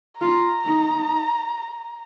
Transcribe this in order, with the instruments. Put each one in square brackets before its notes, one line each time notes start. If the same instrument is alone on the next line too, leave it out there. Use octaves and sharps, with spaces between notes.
[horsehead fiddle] F4 [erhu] A#5
[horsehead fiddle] D#4